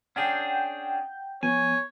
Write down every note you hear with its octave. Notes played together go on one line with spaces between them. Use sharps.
C#4 D4 G#4 F#5 G5 G6
F3 B3 C#5 G#5